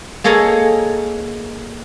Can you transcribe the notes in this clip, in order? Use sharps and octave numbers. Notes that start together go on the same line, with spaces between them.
A#3 G#4 A4 C#5 D#5 A#5